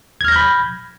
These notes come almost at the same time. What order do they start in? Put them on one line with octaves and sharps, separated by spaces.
G#6 F6 A#6 G6 B5